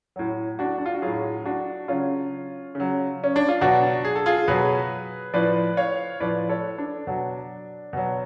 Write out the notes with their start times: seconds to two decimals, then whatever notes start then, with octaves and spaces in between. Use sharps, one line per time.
0.16 A2 F#3
0.59 D4 F#4
0.78 D4
0.86 F4
0.94 F#4
1.02 A2 F#3 F4 G#4
1.45 D4 F#4
1.88 C#3 F#3 C#4 F4
2.75 C#3 F#3
3.24 C#4
3.36 D4
3.48 F4
3.61 B2 F#3 D4 F#4
4.05 G#4
4.15 A4
4.26 F4 G#4
4.48 B2 F#3 G#4 B4
5.33 A2 F3 B4 D5
5.77 C#5 F5
6.20 A2 F3 B4 D5
6.49 A4 C#5
6.78 D4
7.07 B2 F#3
7.93 B2 F#3